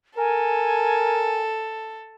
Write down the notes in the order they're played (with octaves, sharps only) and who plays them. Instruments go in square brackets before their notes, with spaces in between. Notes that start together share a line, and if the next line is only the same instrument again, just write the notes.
[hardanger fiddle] A4 [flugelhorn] A#4 [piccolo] G#5